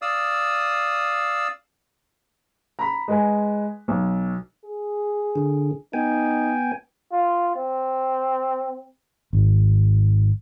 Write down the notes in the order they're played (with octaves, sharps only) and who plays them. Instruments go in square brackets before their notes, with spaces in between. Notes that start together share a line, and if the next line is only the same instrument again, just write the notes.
[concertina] D5 F5 D#6 E6
[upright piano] A#5 B5
G#3 B4 G#5
B1
[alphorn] G#4
[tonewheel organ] D3
[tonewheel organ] B3 G5 G#5 [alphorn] D#4
[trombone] F4
C4
[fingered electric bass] G#1